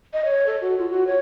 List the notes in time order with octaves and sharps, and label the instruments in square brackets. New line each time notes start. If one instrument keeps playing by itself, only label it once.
[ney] D#5
C#5
A4
F#4
F4
F#4
C#5